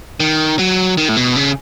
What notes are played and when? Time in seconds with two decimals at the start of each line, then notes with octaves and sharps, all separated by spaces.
0.20 D#3
0.59 F#3
0.97 D#3
1.09 A2
1.17 B2
1.36 C#3